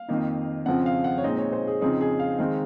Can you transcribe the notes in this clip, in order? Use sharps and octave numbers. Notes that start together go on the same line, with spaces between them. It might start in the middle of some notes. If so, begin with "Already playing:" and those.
Already playing: F5
F2 D#3 A#3 D#4
F2 C#3 F3 C4 F#5
F5
F#5
C#5
A#2 G#3 C4 D#4 D#5
C#5
C5
G#4
F2 C#3 F3 C4 D#4 G#4
G#4
F5
D#3 G#3 C4 D#4 F5